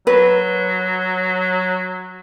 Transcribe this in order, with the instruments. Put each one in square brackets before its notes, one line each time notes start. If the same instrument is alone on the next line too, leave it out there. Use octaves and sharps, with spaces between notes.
[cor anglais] F#3 [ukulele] B4